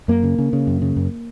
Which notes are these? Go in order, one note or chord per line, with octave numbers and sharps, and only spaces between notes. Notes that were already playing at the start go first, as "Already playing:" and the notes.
F#2 A#3
C#3
C#3
C#3
F#2
C#3
F#2